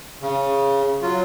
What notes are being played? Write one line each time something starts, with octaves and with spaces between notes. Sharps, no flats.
C#3
F#3 F4